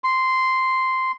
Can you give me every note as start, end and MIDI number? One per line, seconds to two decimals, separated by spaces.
0.04 1.12 84